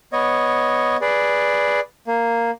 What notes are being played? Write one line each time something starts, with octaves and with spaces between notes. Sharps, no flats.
B3 C#5 D#5
G#4 B4 D5
A#3